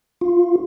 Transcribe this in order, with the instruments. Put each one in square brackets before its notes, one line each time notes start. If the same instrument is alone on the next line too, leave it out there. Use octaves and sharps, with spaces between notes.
[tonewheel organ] F4